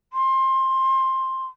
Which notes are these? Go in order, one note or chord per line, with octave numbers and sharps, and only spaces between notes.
C6